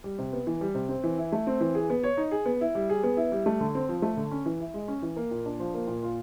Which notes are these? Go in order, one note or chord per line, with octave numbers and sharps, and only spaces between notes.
G3
C3
B3
E3
G3
C3
C4
E3
E4
A3
C4
E3
G#4
B3
C#5
D#4
G#4
B3
E4
G3
G#4
B3
E4
G3
A3
D3
C4
F3
A3
D3
C#4
E3
E4
G#3
C#4
E3
A#3
A#2
D4
F3
A#3
A#2
F4